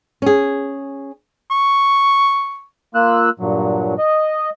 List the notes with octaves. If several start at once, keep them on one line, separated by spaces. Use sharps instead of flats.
C#4 G#4
C#6
A#3 F4 E6 F#6
G2 A#2 F#3
D#5